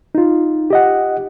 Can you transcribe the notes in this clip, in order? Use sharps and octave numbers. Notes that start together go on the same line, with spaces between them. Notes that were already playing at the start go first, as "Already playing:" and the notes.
D#4 F4
G4 D#5 F#5